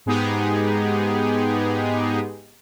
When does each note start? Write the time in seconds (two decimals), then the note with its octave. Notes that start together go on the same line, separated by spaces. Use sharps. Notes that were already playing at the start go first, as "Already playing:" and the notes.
0.06 G#2 G#3 B3 D#4 G4 G#4